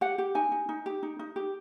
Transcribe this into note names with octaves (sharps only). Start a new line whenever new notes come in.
G4 F#5
G4
D#4 G#5
D#4
D#4
G4
D#4
D#4
G4